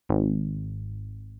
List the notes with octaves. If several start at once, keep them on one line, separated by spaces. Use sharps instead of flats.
G#1